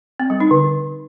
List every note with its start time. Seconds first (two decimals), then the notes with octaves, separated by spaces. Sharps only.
0.20 C4
0.30 G3
0.40 D#4
0.51 D3